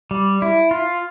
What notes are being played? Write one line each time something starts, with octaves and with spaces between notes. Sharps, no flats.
G3
E4
F4